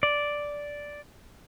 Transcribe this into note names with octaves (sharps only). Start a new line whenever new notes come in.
D5